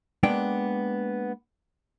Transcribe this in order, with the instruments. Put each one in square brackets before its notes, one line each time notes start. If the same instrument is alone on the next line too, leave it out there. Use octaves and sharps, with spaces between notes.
[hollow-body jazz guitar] G#3 A#3 B3 D4 G5